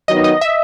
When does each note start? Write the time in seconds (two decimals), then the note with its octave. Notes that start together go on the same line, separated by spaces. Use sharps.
0.08 D#3 F#3 B3 D#4 D#5
0.24 D#5
0.41 E5